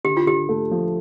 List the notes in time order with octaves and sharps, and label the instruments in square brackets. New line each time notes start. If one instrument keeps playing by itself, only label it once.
[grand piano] D3 [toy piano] G4
[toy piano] F4
[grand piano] D3 [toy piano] G4
[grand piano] A3
F3